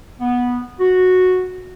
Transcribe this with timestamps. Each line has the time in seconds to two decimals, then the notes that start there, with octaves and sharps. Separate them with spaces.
0.21 B3
0.80 F#4